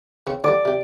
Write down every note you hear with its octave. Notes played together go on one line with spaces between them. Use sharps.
C#3 C4 C#6
D3 G3 D5
C3 G4